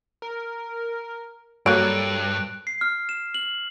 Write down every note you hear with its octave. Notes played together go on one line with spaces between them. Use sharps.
A#4
G2 F#3 A#3 A4 F#6 D7
C7
F6
E7
F#7